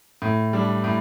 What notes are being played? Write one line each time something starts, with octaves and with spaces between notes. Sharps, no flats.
A2
G3 D4
A2